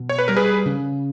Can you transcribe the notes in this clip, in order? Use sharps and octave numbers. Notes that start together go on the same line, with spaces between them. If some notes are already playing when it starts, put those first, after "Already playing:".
Already playing: B2
C#5
B4
G3 A#4
G#4 B4
C#3